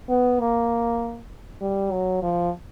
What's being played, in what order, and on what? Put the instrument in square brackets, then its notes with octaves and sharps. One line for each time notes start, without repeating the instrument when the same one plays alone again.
[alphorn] B3
A#3
G3
F#3
F3